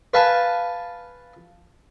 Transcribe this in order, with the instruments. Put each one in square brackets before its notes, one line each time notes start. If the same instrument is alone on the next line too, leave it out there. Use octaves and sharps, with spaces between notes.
[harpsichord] B4 F5 G#5 A5